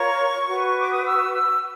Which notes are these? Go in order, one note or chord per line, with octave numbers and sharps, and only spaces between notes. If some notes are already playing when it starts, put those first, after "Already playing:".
Already playing: F4 A#4 C#5 C#6
F#4 B4
D6
D#6
E6
E6